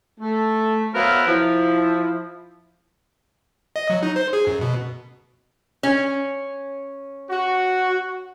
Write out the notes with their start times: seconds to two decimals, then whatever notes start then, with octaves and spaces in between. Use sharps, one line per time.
0.19 A3
0.94 F#3 B3 A#4 C5 E5 F5
1.27 F3 E4
3.76 D#5
3.90 F#3
4.03 D#4
4.16 C5
4.33 G#4
4.47 F#2
4.61 B2
5.83 C#4
7.30 F#4